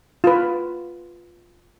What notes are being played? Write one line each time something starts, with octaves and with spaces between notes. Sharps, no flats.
F4 B4